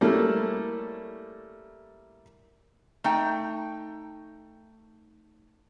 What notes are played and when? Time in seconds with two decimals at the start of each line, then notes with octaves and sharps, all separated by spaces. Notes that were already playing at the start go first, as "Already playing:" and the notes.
0.01 G3 A3 A#3 C#4 E4 A4
3.04 A3 D#4 G5